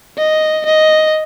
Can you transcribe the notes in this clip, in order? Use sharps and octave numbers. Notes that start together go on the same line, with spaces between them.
D#5
D#5